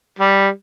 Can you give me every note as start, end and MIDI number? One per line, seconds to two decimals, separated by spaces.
0.19 0.49 55